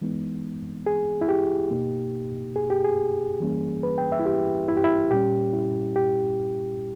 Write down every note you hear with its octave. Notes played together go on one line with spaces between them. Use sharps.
E3 G#3 B3 D#4
G#4
E4
G4
B2 A#3 D#4
G#4
G4
G#4
E3 G3 A#3 C#4
B4
G5
E5
E4
G4
E4
G4
E4
A#2 G3 C#4 G4
E4
G4